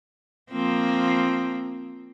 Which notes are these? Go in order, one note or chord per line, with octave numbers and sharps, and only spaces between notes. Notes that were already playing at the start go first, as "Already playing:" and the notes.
F3 A#3 C4